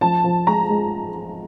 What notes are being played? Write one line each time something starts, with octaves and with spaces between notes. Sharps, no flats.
F3 A5
F3
G#3 A#5
G#3